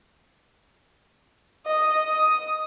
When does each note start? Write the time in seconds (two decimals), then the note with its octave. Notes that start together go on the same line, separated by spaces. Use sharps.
1.66 D#5
2.05 D#6